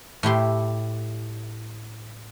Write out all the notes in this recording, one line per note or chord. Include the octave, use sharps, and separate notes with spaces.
A2 E4 G4 C6